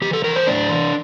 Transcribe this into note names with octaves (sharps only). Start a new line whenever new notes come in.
E3 G4
A4
E3 A#4
C5
A2 D4
E3